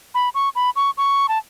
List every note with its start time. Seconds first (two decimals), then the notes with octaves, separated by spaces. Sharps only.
0.14 B5
0.35 C#6
0.55 B5
0.76 C#6
0.97 C#6
1.29 A5